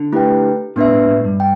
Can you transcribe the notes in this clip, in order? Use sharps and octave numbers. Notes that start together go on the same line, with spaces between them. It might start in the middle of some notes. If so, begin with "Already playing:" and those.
Already playing: D3
A3 E4 G4 B4 G5
A2 B3 D4 B4 E5
A2
A2
G2
G5